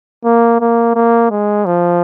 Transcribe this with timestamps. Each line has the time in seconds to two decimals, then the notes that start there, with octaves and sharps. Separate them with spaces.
0.25 A#3
0.61 A#3
0.95 A#3
1.31 G#3
1.66 F3